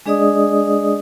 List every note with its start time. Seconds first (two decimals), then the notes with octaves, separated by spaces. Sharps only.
0.06 G#3 D4 G#4 D5 D#5 D#6